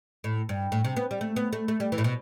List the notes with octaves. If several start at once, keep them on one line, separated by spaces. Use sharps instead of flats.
A2
G2
A2
C3
B3
G3
A3
B3
A3
A3
G3
E3
A2
B2